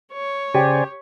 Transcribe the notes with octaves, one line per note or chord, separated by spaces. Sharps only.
C#5
C#3 G4 C5 D5 G5 G#5